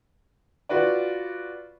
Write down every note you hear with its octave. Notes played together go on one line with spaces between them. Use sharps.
F4 F#4 B4 D5